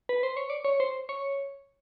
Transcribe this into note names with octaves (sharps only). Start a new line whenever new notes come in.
B4
C5
C#5
D5
C#5
C5
C#5